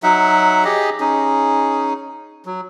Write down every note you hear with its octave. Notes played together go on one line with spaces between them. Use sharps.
F#3 D#4 E5 F#5
G4 G#4 D#5
C#4 D#4 G#4
F#3